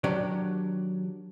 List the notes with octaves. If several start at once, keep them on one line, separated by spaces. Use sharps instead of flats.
D#3 F#3 D4 G4 C#5 D5